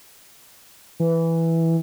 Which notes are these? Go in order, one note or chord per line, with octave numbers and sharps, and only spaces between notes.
E3